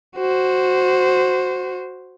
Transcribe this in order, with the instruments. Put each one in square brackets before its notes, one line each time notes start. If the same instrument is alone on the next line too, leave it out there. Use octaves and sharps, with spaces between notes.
[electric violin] F#4 C5